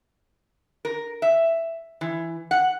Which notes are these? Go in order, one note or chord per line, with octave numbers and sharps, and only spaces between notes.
A#4
E5
E3
F#5